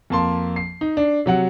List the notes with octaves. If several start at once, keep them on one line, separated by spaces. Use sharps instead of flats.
F2 A#3 A5 C6
C7
D#4
D4
C3 F#3 F#5